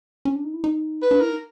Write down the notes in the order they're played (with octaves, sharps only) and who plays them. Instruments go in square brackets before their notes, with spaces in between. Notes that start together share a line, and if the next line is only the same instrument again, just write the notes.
[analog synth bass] C#4
D4
D#4
E4
D#4
[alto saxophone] B4
[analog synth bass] D4
[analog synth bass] E4 [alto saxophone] A#4
[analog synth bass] D#4